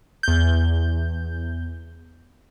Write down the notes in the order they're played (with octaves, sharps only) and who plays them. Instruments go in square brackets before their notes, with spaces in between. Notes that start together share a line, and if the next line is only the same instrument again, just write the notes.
[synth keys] E2 G6